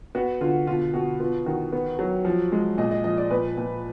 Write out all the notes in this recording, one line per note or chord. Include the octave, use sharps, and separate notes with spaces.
B3 F#4
D3 F4
B2 F4
B2 F#4
B3 F4
D#3 F#4
B3
F#3
F3
G#3
A#2 D#5
D#5
F3 D#5
D5
A#2 B4
A#2